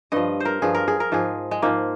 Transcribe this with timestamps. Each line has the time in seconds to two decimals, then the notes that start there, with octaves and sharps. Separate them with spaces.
0.12 G2 F3 D#5
0.40 C5
0.45 A#4
0.62 G2 F3 G#4
0.75 A#4
0.88 G#4
1.00 A#4
1.12 G#2 F3 G#4
1.51 G#3
1.62 G#2 F3 A#3